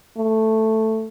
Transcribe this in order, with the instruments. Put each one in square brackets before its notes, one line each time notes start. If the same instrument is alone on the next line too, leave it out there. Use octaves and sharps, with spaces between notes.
[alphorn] A3